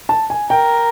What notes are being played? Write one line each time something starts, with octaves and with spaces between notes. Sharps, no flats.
A5
G#5
A#4 G5